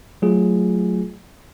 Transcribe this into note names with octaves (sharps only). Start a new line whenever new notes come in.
F#3 A3 F4 G#4